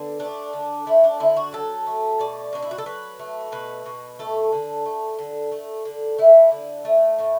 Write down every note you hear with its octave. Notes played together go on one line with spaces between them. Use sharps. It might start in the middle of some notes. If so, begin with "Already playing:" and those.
Already playing: D3 B3
A3 D4
D3
A3 E4
D4
D3 E4
F#4
F#3 A4
A3
B2 D5
B2 D4
E4
F#4
A4
F#3 B4
A3
B2 B4
B2
A3 A4
D3
A3
D3
A3
D3
A3 E4
D3
A3
A2